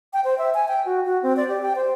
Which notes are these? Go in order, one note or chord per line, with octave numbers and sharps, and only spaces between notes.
G5
C5
E5
G#5
G5
F#4
F#4
C4
D5
G4
G5
C5